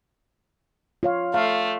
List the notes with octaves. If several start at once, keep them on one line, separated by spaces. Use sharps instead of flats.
F4 C#5 F5
A3 F5